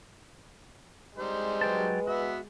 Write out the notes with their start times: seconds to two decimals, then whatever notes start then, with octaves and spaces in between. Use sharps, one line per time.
1.18 G3 G#3 D#4 C5
1.61 F#3 B4 G5 A5
2.07 B3 F#4 E5